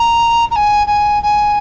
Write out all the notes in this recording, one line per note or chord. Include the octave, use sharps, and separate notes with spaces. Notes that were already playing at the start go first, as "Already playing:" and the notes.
Already playing: A#5
A#5
G#5
G#5
G#5